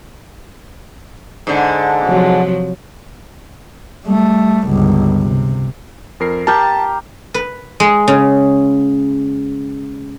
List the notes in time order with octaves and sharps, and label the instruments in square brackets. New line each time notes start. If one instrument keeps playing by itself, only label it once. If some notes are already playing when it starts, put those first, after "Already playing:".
[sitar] G#2 D3
[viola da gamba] C3 F3 F#3
[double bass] G3 A3
G1 C#2
C3
[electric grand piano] F2 A#4 C7
[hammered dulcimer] G4 A#4 [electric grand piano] A5 F6 G6
[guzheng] B4
G#3
C#3